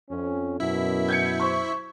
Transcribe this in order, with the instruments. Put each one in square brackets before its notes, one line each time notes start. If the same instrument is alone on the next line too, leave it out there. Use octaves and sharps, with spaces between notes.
[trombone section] F2 C#4
[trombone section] F#2 B2 [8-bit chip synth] E4 E5
[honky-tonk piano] G6 G#6 C#7
C5 C#6